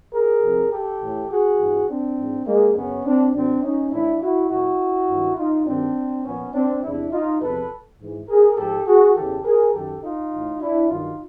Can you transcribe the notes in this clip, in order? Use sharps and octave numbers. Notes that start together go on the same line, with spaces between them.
G#4 A#4
F2 C3 F3
G4 A4
A2 E3
F#4 G#4
G2 E3
C4 D4
G#2 E3
G#3 A#3
F#2 C#3 F#3 B3 C#4
C4 D4
F#2 D3 F#3 C4 D4
C#4 D#4
A2 E3 D4 E4
E4 F#4
A#2 F#3 E4 F#4
G2 D#3 F#3
D#4 F4
G2 D#3 F#3 C4 D4
A#2 F3 B3 C#4
C4 D4
E2 C3 F3 D4 E4
D#4 F4
E2 C3 F3 A4 B4
G#2 E3
G#4 A#4
G#2 F3 G4 A4
F#4 G#4
E2 C#3 E3 G4 A4
G#4 A#4
F#2 D#3 F#3 G4 A4
D#4 F4
A2 E3
D4 E4
G2 D#3 F#3 D#4 F4